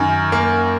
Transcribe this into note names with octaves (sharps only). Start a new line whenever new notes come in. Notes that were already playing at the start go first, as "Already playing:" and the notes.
Already playing: F#2 D#3
A#3